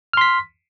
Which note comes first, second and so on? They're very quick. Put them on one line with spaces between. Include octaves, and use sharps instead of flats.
F6 C6 B6